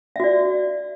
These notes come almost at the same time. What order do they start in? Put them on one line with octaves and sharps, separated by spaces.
E5 F#4 D5